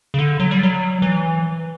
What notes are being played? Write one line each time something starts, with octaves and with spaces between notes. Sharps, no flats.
C#3
D3
F#3
G3
F#3
E3